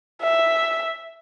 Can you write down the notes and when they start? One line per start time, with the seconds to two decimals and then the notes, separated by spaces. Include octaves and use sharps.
0.22 E5